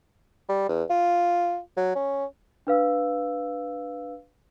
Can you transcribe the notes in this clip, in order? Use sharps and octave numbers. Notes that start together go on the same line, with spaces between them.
G3
E2
F4
F#3
C#4
D4 B4 F5 E6